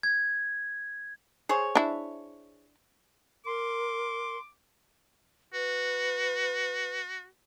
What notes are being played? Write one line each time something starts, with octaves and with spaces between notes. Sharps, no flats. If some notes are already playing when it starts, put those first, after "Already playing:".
G#6
G#4 C5 C#5
D4 E4
A#4 C6 D6
F#4 B4